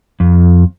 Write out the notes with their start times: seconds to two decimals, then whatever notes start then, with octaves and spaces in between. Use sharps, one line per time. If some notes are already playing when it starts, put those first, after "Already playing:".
0.20 F2